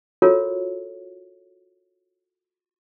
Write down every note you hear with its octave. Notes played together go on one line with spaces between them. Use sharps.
F4 F#4 A4 A#4 C#5